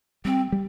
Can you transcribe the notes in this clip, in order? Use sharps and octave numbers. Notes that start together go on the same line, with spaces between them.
G3 C4
G3